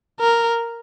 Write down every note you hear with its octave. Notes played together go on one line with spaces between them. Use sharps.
A#4